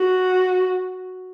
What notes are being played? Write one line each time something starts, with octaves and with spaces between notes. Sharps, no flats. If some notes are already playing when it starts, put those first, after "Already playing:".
Already playing: F#4